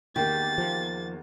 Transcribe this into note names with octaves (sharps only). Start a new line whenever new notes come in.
E2 D#3 A#3 G4 A6
F3